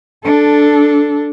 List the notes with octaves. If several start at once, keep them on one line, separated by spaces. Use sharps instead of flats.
D4 A4